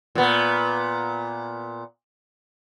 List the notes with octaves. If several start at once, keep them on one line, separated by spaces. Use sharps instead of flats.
A#2 B3